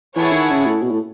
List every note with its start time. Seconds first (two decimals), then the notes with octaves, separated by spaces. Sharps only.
0.16 E3 E4 G#4 C#5 F#5 A5
0.32 D#3
0.50 C#3
0.66 A2
0.82 B2
0.91 A2